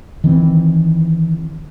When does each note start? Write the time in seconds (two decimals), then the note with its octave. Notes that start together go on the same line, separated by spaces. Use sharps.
0.24 D#3 E3 C4